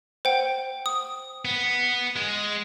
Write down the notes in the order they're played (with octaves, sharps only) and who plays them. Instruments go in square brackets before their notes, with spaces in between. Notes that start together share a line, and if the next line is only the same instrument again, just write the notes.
[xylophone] C5 F#5 G5
D#6
[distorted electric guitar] B3
G#3